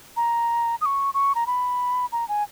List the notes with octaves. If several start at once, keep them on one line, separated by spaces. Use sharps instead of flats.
A#5
D#6
C#6
C#6
A#5
B5
A#5
G#5